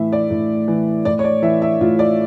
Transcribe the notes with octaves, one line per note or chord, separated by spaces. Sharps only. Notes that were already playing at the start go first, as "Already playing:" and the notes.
Already playing: A2 E3 E5
D5
A2
E3
A2 D5
C#5
D5
E3 E5
E5
A2 F4
D5